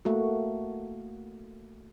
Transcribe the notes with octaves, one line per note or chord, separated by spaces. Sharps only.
A3 A#3 F#4